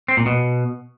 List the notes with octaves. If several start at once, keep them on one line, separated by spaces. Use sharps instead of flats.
C4
A#2
B2